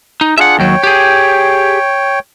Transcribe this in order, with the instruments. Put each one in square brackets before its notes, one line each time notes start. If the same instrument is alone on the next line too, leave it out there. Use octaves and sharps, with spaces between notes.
[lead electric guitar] D#4
[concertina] D4 F4 G#4 [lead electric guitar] E5 F#5
[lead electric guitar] D#2 F#3 [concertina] C#5 G5
[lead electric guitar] G4 G#4